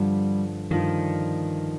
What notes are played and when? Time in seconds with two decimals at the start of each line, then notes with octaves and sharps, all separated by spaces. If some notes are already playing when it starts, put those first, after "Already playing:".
Already playing: G2 D3 F3 G3
0.71 G2 D3 D#3 F3